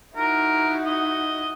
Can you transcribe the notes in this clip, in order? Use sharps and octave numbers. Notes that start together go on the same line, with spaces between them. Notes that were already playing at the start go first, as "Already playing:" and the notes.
D#4 E4 F#4 A#4
D#5